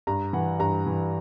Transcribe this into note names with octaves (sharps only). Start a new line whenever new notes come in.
G2 A#5
E3 F#5
G2 A#5
E3